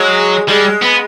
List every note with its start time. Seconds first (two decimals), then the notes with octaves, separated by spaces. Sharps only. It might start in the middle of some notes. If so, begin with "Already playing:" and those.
Already playing: F#3 G#3
0.48 G3 G#3
0.82 B3